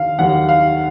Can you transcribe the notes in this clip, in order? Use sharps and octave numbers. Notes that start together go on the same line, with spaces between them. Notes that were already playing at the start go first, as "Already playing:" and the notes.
Already playing: D#2 D#3 F5
D#2 D#3 F#3 F#5
F5